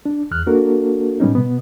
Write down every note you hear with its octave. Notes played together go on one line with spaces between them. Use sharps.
D4
E2 F6 F#6
A#3 D4 F#4 A4 A#4
A2 G3 B3 C#4 D#4
B2 B3